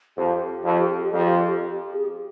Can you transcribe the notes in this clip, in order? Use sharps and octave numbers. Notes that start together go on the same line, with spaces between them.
F2 G4
F2
F2
G#4
G4